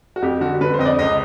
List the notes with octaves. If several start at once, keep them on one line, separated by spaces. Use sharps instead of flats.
F#4
F2 G4
D3 F#4
D3 B4
C5
F2 D#5
D5
C#2 D#5